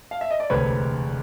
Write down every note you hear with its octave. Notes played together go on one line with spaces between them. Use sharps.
F5
E5
D#5
D5
E1 D2 C3 B4 C#5